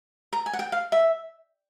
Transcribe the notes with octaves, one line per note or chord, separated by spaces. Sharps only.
A#5
G#5
F#5
G5
F5
E5